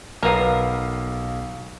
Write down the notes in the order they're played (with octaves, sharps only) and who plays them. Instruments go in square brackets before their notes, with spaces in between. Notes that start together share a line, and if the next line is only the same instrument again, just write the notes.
[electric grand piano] B1 F5 C7 [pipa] B3 A#4